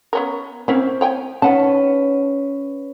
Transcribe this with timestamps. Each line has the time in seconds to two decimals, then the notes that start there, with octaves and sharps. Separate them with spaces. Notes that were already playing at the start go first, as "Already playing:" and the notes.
0.13 B3 C#4 A#4
0.68 A#3 C4 C#4 E4
1.01 C#5 G5 G#5
1.42 D#3 C#4 B4 F#5 A5